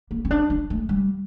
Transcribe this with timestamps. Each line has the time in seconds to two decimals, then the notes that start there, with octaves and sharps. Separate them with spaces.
0.11 A#3
0.25 C4
0.31 D4
0.50 D4
0.70 A3
0.89 G3